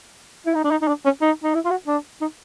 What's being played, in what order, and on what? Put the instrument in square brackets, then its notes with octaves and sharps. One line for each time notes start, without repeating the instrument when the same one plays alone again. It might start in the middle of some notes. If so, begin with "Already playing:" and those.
[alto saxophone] E4
D#4
D4
D#4
D#4
D4
C#4
D#4
D#4
E4
F4
F#4
D4
D#4